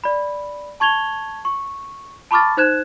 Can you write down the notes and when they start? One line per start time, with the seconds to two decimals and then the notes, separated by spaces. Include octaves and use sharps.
0.04 D5 B5
0.80 A5 C#6 G#6 F7 G7
1.45 C#6
2.31 A5 B5 C#6 D6 F6 A6
2.57 D#4 C5 F#6 G#6 E7